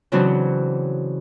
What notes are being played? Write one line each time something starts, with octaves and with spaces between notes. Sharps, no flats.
C#3 E3 F#3 C4 D4 F#4